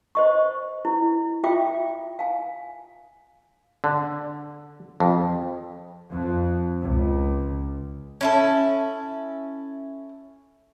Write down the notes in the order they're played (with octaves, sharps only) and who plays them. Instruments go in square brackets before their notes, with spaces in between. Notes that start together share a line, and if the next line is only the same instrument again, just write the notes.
[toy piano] C5 D#5 C#6
E4
F4 E5 G5 D6
F5 G#5
[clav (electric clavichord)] D3
F2
[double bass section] F2
C#2
[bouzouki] C#4 E4 A4